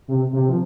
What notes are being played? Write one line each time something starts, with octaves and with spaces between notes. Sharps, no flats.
C3
C3
F3